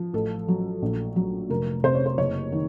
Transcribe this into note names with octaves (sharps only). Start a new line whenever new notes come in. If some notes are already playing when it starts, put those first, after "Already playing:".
Already playing: F3
A1 A4
F#3
A#1
F#3
F1 A#4
C3 C5
C#5
C5
F#1 C#5
D#3